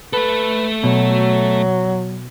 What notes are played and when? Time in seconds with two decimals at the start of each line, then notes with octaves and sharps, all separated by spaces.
0.13 A3 A4 B4
0.83 B2 F#3